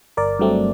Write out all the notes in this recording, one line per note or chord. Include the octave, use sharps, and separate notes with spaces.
G1 A#4 D5
G2 F#3 A3 C4